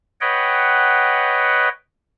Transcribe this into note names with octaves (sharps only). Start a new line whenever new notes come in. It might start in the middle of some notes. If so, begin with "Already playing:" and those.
B4 C#5 D#5 F#5 G5